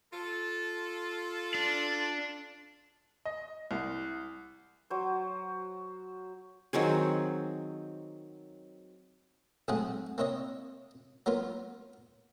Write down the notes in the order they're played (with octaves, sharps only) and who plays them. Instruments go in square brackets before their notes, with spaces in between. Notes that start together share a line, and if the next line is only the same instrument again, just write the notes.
[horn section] F4 A4
[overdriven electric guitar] D4
[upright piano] D#5
C2
[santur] F#3 C5
[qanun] D#3 F#3 C4 G#4
[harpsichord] B1 G#2 A3 C4 G#4 F#5
A#3 C4 E4 C#5 D#5
F#3 A#3 B3 F4